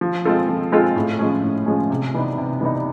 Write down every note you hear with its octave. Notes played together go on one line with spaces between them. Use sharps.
F3
G#3 C4 F4 A4
F3
G#3 C4 F4 A4
A2
F3 G#3 C#4
A2
F3 G#3 C#4
C3
E3 G3 B3 D#4
C3
E3 G3 B3 D#4